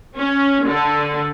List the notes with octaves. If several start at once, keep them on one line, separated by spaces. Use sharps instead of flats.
C#4
D3